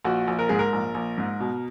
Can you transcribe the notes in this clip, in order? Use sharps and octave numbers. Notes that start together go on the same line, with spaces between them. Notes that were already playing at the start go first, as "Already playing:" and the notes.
A#1 F#4
A#1
A#4
G#2 G#4
A#4
A#1
A#1
G#2
B2